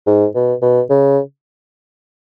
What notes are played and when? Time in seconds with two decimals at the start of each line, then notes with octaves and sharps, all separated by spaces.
0.07 G#2
0.35 B2
0.62 B2
0.90 C#3